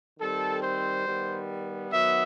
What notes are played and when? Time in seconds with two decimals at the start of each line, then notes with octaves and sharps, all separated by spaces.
0.19 D#3 G3 C4 A4
0.62 C5
1.06 D#3 G3 B3
1.91 D#3 F#3 B3 E5